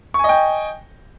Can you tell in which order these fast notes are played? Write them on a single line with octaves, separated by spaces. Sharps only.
C#6 G#5 D#5 G5